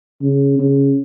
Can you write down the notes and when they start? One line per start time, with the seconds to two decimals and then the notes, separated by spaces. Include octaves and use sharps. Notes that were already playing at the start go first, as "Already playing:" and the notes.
0.22 C#3
0.59 C#3